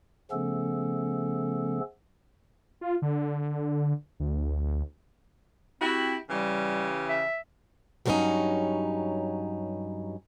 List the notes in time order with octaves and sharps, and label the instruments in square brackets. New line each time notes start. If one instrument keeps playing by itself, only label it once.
[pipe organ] C#3 F3 A3 B3 C#4 A4
[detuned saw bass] F4
D3
D2
[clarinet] C4 [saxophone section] E4 F#4 G4
[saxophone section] C#3 E3 G4 [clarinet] G3
[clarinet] E5
[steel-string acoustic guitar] G2 F#3 G3 C4 C#4 D#4